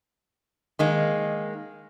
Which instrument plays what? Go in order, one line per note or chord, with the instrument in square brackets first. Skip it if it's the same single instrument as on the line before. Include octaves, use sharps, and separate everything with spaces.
[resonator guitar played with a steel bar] D#3 G#3 A#3